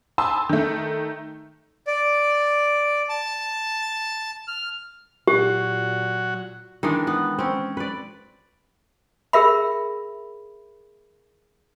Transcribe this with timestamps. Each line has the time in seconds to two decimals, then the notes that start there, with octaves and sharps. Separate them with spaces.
0.18 G#5 A5 B5 C6 D#6 E6
0.49 D#3 A3
1.87 D5
3.09 A5
4.48 F6
5.28 A#2 F#3 F#4 G4
6.83 D#3 E3 G#3 D4
7.07 B3
7.39 C4 C#4
7.77 B4 D5
9.33 G#4 A#4 E5 B5